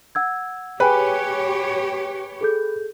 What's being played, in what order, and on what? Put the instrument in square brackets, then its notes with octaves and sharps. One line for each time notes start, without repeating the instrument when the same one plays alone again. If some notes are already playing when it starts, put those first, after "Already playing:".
[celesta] F#5 E6 G#6
[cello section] G4 C#5 [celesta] G#4 G5 G#5 [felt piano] B4
[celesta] G#4 A4 G6